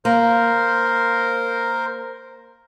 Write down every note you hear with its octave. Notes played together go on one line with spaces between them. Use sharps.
A#3 A#4 C5